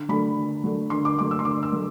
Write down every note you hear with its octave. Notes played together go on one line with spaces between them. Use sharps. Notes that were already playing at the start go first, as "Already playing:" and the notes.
Already playing: D3
F#3 A3 D4 B5
D3
F#3 A3 D4
D3 C6
D6
F#3 A3 D4 D6
E6
C6
D3 D6
E6
F#3 A3